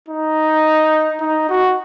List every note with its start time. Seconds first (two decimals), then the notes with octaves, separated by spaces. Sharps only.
0.08 D#4
1.21 D#4
1.50 F#4